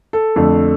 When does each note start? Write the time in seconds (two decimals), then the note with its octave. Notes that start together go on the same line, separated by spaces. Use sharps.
0.13 A4
0.36 F2 D3 A3